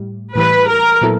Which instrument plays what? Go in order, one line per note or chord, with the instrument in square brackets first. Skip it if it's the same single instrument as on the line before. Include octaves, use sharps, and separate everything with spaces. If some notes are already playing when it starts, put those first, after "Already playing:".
Already playing: [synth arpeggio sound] A2 G3
[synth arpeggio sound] A2 E3 G3 [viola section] B4
[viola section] A#4
[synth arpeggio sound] A#2 F#3 B3 E4 A4